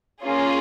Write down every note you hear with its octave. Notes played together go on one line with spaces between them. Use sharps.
A#3 C#4 F4 G#4